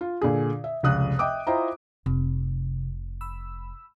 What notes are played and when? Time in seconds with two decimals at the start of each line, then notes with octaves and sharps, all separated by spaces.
0.01 F4
0.21 A#2 D3 G#4
0.64 E5
0.83 F1 C#2 D#6 F#6
1.19 D#5 E5 G5 D6 D#6
1.47 E4 F4 C5 D#5 G5 A#5
2.06 F1 C3
3.21 B5 E6